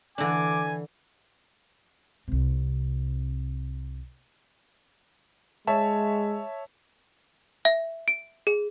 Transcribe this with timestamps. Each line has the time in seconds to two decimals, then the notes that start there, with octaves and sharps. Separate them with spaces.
0.18 D3 E3 D4 G#5 D6
2.28 C2 C3
5.67 G#3 C#5 E5 A5
7.65 E5
8.08 D7
8.47 G#4